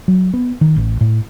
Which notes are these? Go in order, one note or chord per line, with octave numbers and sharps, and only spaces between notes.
F#3
B3
D#3
A1
A2